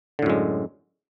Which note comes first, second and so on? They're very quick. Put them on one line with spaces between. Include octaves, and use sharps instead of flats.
D3 A2 F#2 G#3